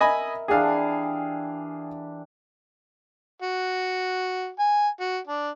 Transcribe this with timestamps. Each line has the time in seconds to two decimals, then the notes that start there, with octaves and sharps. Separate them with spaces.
0.01 A#4 D#5 E5 G#5 B5
0.48 E3 D4 G4 G#4 F5
3.42 F#4
4.59 G#5
5.00 F#4
5.27 D4